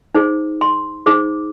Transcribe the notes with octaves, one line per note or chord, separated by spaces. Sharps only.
D#4 G#4 C5
C6
D#4 G#4 C5 D6